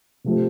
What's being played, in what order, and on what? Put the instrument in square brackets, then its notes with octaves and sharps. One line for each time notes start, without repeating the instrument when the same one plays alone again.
[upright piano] C3 F3 A3 C4 G4